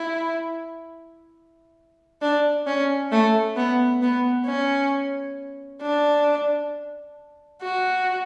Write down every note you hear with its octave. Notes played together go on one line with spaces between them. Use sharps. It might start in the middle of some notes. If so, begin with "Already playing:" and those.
Already playing: E4
D4
C#4
A3
B3
B3
C#4
D4
F#4